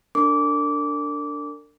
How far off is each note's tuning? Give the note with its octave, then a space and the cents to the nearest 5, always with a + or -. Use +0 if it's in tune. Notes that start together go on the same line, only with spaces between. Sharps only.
D4 +0 A#4 -45 D6 -20